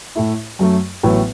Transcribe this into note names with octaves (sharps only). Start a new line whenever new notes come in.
A2 A3 E4
F#2 F#3 A3
A1 A2 F#3 B3